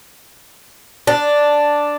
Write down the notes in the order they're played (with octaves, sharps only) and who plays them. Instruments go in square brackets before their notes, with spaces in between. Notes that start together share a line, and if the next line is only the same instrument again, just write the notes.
[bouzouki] D4